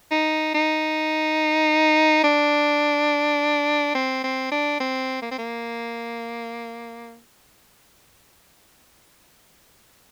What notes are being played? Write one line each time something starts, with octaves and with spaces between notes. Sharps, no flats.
D#4
D#4
D4
C4
C4
D4
C4
A#3
C4
A#3